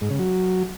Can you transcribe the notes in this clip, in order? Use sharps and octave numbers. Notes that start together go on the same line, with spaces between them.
G#2
C#3
F#3